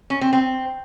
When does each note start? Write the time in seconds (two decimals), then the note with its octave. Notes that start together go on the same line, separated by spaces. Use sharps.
0.10 C#4
0.21 C4
0.33 C4